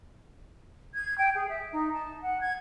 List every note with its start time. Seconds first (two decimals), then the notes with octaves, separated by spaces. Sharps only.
0.94 G#6
1.18 G5
1.35 G#4
1.49 E5
1.72 D#4
1.93 A5
2.22 F#5
2.41 G#6